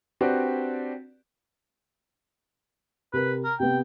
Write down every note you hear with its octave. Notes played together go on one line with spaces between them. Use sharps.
C4 D4 F#4 G4 B4 D5
C3 A#4 B4
A#4
C3 B3 G5